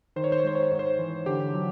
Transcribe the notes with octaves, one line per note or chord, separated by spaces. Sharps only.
D#3 C5
C#5
C5
C#5
G#3 C5
C#5
C5
G#2 C#5
C5
E3
D3 G4
F#3